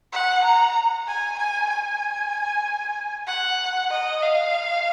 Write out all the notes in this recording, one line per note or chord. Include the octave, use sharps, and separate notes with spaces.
F#5
A#5
G#5
G#5
G#5
F#5
D#5
F5